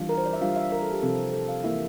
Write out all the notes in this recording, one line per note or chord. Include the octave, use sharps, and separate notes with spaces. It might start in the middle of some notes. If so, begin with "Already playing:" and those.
Already playing: E3 G3 D4 F4
A#4
C5
D5
E5
G3 D4 F4 F5
E5
A#4
A4
G4
C3 F3 C4 A4
A4
F5
E3 A#3 E4 E5